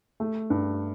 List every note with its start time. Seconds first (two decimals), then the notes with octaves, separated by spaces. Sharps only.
0.20 A3
0.50 G2